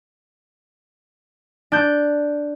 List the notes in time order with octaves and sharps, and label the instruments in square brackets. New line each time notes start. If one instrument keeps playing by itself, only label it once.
[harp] D4 G6